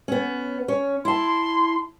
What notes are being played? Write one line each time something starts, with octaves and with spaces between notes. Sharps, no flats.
B3 C#4
C#4 C#5
E4 A5 C6